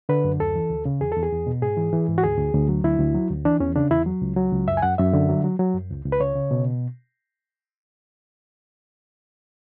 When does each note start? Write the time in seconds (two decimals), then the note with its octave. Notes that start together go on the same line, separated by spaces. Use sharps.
0.09 D3 B4
0.24 F#2
0.40 D2 A4
0.56 E3
0.70 D2
0.85 C#3
1.01 E2 G#4
1.12 E2 A4
1.23 G#4
1.32 E2
1.47 B2
1.62 G#2 G#4
1.77 E3
1.92 E3
2.08 G#2
2.18 F#4
2.23 D2 G#4
2.38 D2
2.54 D2
2.69 F#3
2.84 D2 E4
2.99 D2
3.15 F#3
3.30 D2
3.45 E3 D4
3.60 E2 C#4
3.76 C#3 D4
3.91 E2 E4
4.06 F#3
4.22 C#2
4.36 F#3
4.52 C#2
4.68 F#2 E5
4.77 G#5
4.82 F#2 F#5
4.98 F#2 E5
5.13 D3
5.29 F#3
5.44 F#3
5.59 F#3
5.74 F#2
5.90 C#2
6.05 C#2
6.12 B4
6.21 C#3 C#5
6.36 C#3
6.51 B2